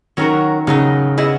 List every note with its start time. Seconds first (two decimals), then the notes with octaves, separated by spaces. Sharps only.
0.17 D#3 F#3 C#4 F#4 A#4
0.67 C#3 F#3 B3 D#4
1.18 B3 E4 G#4 D#5